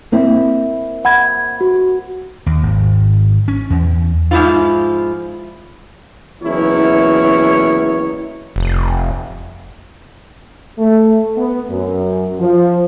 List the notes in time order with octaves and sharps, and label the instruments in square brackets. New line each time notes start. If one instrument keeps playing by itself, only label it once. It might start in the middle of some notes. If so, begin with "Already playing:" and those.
[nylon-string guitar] A#3 C4 E4
[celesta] F#5 B5 G#6
F#4
[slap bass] D#2
G#1
C#4
E2
[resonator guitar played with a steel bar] G#2 D#3 F3 E4 F4
[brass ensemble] F#1 E2 D#3 E4 C#5
[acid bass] F1
[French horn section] A3
B3
F#2
F3